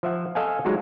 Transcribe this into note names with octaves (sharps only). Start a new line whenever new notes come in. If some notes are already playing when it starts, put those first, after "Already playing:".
F3 E5 F#5
A4 D#5 F5 F#5 G#5
F#3 G#3 D#4 F4 F#4